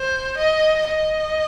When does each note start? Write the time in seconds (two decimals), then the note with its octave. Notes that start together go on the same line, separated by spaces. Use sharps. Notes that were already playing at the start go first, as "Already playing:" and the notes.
Already playing: C5
0.38 D#5
0.88 D#5